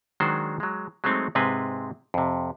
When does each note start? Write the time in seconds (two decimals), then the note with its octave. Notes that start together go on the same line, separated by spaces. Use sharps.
0.20 D#3 F#3 G#3 D4 F#4 C5
0.60 F#3 G#3
1.04 F#3 G#3 A3 C4 D#4
1.35 G#2 C3 G#3 C4 B4 G#5
2.14 F2 C3